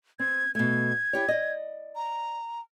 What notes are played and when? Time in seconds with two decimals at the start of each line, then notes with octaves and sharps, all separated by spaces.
0.20 C4 G#6
0.55 B2 A3 G#6
1.13 E4 G4 C#5
1.28 D5 D#5
1.96 A#5